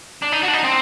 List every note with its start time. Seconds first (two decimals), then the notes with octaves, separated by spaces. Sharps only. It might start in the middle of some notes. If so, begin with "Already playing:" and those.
0.22 D4
0.32 D#4
0.43 F#4
0.48 D4
0.53 D#4
0.64 C4